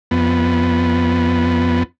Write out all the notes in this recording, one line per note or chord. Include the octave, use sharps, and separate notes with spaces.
F2 B3